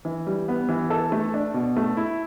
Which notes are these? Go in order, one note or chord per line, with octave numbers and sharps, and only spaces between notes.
E3
G3
B3
E3
A4
A3
D4
B2
A3
E4